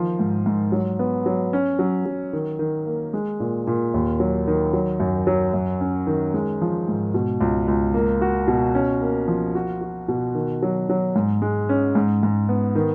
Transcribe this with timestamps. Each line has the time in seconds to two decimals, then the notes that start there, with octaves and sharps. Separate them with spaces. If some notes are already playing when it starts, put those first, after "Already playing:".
Already playing: D#3 F3 A#3
0.19 G#2
0.46 G#2
0.72 F#3
0.99 B3
1.26 F#3
1.53 C#4
1.79 F#3
2.06 F#3
2.33 D#3
2.59 D#3
2.86 A#3
3.14 G#3
3.40 A#2
3.67 A#2
3.94 D#2
4.20 F#3
4.48 D#3
4.73 F#3
5.00 F#2
5.27 F#3
5.54 F#2
5.81 C#4
6.07 D#3
6.34 G#3
6.62 F3
6.88 G#2
7.14 B2
7.41 C#2
7.68 C#2
7.94 A#3
8.21 F#4
8.48 B2
8.75 C#4
9.01 A#3
9.28 F3
9.55 F#4
9.81 F#4
10.08 B2
10.35 D#3
10.63 F#3
10.89 F#3
11.16 G#2
11.42 G#3
11.69 C#4
11.95 G#2
12.23 G#2
12.49 B3
12.76 D#3